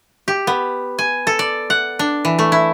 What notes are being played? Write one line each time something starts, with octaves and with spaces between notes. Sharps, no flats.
G4
B3
G#5
A4
D5
F#5
D4
E3
A3
E4